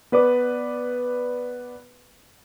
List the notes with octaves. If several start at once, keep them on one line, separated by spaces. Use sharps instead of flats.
B3 B4 D5 D6